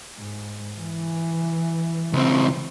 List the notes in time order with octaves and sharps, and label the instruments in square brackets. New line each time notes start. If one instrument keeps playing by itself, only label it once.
[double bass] G#2
E3
[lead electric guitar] C#2 C4